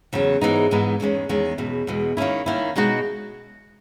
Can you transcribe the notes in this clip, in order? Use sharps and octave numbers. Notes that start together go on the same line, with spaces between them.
E2 C#3 F#3
G#2 E3 G#3 B3 D#4
G#2 E3 G#3 B3 D#4
E2 D#3 G#3 C#4
E2 D#3 G#3 C#4
E2 B2 G#3
E2 B2 G#3
D#3 A#3 C#4 E4
D#3 A#3 C#4 E4
B2 G#3 D#4 F#4